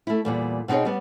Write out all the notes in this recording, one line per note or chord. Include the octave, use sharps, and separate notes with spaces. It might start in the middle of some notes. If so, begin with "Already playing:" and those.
A3 E4
E2 A#2 G3
B2 C4 D#4 G#4 C#5
G3 B3